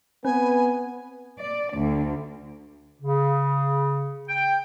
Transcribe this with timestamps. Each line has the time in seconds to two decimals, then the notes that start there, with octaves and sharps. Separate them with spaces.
0.25 B3 C4 B4 G#5
1.40 D5
1.77 D2
3.01 C#3
4.29 G5